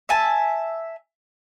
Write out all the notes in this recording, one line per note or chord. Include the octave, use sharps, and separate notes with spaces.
E5 G#5 A5